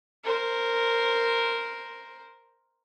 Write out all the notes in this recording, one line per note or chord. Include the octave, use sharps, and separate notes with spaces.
A#4 C5